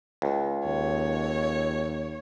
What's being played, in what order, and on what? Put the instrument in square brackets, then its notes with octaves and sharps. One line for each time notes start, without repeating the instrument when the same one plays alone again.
[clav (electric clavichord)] C#2
[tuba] D#2 [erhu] C#5